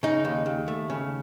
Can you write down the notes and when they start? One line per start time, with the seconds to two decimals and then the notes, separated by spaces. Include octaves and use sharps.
0.03 C#3 D#4
0.25 D#2
0.46 D#2
0.68 A3
0.90 C#3